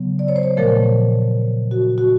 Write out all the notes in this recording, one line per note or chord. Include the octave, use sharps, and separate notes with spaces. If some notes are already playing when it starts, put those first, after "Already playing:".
Already playing: C#3 F#3 B3
D5
C#5
C5
C#5
A#2 F3 A3 A#4
F#4
F#4